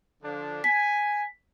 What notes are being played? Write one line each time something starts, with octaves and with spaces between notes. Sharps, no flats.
D3 F3 D4
G#5 B6